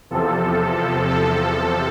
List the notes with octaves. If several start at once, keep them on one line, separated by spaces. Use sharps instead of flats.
E2 C3 F3 A4
A4